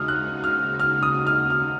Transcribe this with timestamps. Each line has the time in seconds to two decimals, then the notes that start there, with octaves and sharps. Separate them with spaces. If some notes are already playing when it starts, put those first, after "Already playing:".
Already playing: D#2 C#3 G#3 D#4 F#4 D#6 F6
0.08 F#6
0.44 F6
0.80 F6
1.03 D#6
1.27 F6
1.50 F6